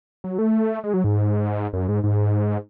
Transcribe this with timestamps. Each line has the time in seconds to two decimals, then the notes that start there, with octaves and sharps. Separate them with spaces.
0.24 F#3
0.38 A3
0.84 G#3
0.94 F#3
1.04 G#2
1.73 F#2
1.89 G#2
2.04 G#2